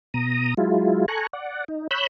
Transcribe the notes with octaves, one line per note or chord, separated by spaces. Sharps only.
B2 A#5 D#6
F#3 G#3 E4 F4
A4 G#5 A#5 C#6 F#6
D5 F#5
D#4
C#5 B5 E6 F#6 G6